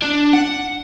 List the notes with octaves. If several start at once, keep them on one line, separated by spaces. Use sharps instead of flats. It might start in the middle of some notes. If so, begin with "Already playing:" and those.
D4
F#5